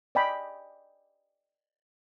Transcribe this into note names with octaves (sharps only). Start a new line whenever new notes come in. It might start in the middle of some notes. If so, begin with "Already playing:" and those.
D5 D#5 G5 G#5 B5